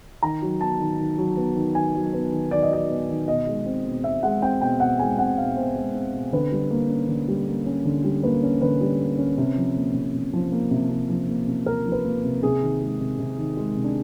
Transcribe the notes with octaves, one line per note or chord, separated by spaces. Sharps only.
D#3 A#5
F#3
B3 A5
D#3
D#3
F#3
B3
D#3
D#3 G#5
F#3
B3
D#3
D#3 D5
D#5
F#3 D5
B3
D#3
B2 D#5
G#3
C4
B2
B2 E5
G#3 F#5
C4 G5
B2 G5
B2 F#5
G#3 G#5
C4 F#5
B2 F5
B2 C5
G#3
C4
B2
D3 B4
G3
A#3
C#4
D3
G3
A#3
C#4
D3
G3
A#3 B4
C#4
D3 B4
G3
A#3
C#4
C3
F3
A#3
C3
C3
F3
A#3
C3
C3
F3
A#3
C3
C3 A#4
F3
B4
A#3
C3
C3 G#4
D#3
G#3
C3
C3
D#3
G#3
C3
D4